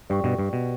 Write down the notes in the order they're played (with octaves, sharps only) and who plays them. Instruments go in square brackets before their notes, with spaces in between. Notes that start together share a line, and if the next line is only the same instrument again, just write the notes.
[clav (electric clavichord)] G2 [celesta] G4 D5 G5 C#6
[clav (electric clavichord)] G2 B2
G2
B2